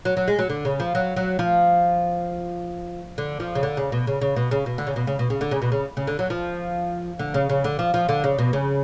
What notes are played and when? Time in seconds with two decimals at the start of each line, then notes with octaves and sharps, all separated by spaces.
0.05 F#3
0.17 F#3
0.28 G#3
0.39 F#3
0.50 D3
0.65 C#3
0.80 F3
0.95 F#3
1.16 F#3
1.39 F3
3.18 D3
3.40 F3
3.55 C#3
3.63 D3
3.77 C#3
3.92 B2
4.07 C#3
4.21 C#3
4.36 B2
4.51 C#3
4.66 B2
4.78 D3
4.87 C#3
4.96 B2
5.07 C#3
5.19 B2
5.30 C#3
5.41 D3
5.51 C#3
5.62 B2
5.72 C#3
5.97 C#3
6.07 D3
6.19 F#3
6.30 F3
7.19 D3
7.34 C#3
7.49 C#3
7.64 D3
7.79 F3
7.94 F3
8.09 D3
8.24 C#3
8.39 B2
8.53 C#3